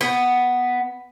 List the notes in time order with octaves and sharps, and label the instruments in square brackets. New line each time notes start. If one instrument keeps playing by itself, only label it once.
[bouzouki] B3